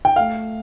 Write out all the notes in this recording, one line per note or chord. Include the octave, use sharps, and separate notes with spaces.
G5
A3 F5